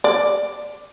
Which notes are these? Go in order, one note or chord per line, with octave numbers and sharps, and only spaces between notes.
D5